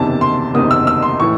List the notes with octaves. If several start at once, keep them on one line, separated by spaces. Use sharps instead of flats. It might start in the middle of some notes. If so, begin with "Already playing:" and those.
Already playing: F#1 E2 C3 D#3 A5
C6
F#1 E2 C3 D#3 D#6
E6
E6
C6
A2 E3 C#6